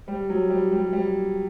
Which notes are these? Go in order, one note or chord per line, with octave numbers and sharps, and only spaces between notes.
G3
F#3
G3
G3
G3